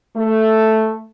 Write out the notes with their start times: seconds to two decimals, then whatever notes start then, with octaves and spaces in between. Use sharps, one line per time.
0.16 A3